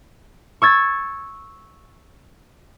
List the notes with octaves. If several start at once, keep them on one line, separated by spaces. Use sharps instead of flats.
C#6 E6 G#6 A6